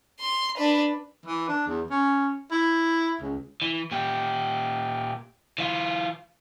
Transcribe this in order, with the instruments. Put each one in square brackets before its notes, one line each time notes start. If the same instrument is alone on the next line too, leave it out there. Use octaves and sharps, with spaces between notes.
[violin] C6
D4 B4
[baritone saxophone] E3
D4
E2
C#4
E4
C#2
[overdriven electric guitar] E3
A#2 G4
E3 F4